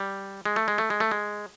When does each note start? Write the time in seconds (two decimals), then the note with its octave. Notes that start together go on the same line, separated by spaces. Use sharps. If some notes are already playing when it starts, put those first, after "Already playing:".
Already playing: G3
0.45 G#3
0.56 A3
0.68 G#3
0.78 A3
0.90 G#3
1.00 A3
1.11 G#3